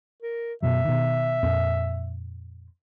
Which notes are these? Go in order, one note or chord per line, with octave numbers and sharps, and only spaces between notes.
A#4
F#2 B2 F#3 E5
B2 D#3
F2 A#2 C4